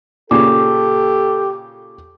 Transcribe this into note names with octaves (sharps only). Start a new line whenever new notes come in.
A#2 C#3 G4 A4 D6